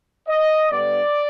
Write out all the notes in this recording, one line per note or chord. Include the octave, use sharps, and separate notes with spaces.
D#5
G2 D3 G3 B3 D5